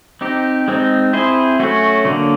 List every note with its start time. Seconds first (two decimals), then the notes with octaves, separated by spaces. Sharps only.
0.21 C4 D#4 G4
0.68 G#3 C4 D#4
1.13 C4 E4 G#4 C5
1.59 F#3 A3 C#4 F#4
2.05 D3 F#3 A#3